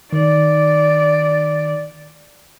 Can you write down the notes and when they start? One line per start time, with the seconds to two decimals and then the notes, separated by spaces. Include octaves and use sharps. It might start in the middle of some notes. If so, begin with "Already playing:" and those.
0.13 D#3 D5